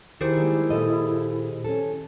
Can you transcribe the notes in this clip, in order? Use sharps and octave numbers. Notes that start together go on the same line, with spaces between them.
D#3 E4 G4 G#4 A#4 C5
G3 G#3 A#3
A#2 A4 D#5
C#4 A4